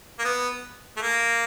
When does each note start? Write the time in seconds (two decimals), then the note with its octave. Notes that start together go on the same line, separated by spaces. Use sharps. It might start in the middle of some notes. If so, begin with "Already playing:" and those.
0.19 A#3
0.25 B3
0.97 A3
1.02 A#3